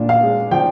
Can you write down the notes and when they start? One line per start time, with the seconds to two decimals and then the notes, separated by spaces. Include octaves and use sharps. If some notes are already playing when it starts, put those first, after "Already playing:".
Already playing: A#2 D4
0.09 F5
0.23 G#3
0.51 F3 G5